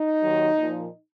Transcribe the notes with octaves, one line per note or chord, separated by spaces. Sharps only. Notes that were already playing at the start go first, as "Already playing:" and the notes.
Already playing: D#4
D#2 D#3 F#3
A#2 F3